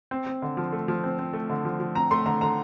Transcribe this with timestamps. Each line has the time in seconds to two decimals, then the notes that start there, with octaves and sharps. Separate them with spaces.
0.11 C4
0.26 C4
0.42 D3
0.57 F3
0.72 A3
0.88 F3
1.04 C4
1.19 C4
1.33 A3
1.50 D3
1.65 F3
1.80 F3
1.95 C4 A#5
2.11 A3 C6
2.26 D3 A#5
2.41 D3 A#5